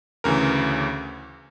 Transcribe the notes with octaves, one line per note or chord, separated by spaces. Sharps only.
D2 C#3 E3 A#4